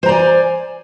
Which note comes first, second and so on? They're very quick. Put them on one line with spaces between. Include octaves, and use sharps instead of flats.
C5 A#5 D5 G#5